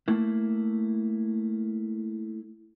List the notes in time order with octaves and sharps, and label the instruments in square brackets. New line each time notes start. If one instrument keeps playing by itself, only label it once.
[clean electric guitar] A3 A#3 E4